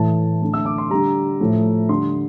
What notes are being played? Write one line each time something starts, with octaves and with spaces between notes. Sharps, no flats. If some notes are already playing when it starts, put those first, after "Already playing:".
Already playing: A2 E3 A3 A5
D3 A3
E6
D6
C6
D3 G3 A#5
A2 F3 A3
D3 C6
G3